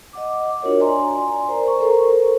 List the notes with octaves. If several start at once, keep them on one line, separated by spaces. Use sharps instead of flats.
D#5 F#5 D6
D4 F4 F#4 A#4 C#5
D5 G#5 A#5 C6
A#4 C5
A#5 C#6
A4 A#4 C5